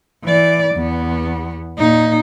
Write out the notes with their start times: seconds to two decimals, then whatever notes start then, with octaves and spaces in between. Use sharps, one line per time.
0.24 E3 D5
0.75 E2 B3
1.78 A#2 D#4